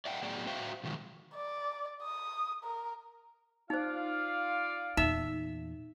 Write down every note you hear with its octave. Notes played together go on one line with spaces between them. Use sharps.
D5 E5 F#5 G5
A2 F#3 B3 G#4 D5 G5
F#4 C5 E5 F5 G5
B2 D#3 F3 F#3 G#3
D5
D#6
A#4
D#4 F4 C5 D5 F5
E2 A#2 D#4 E5